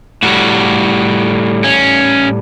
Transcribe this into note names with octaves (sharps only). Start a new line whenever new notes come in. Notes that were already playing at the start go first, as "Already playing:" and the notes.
A2 G3 F#4
C#4